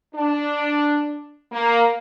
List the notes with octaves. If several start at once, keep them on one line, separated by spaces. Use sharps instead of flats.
D4
A#3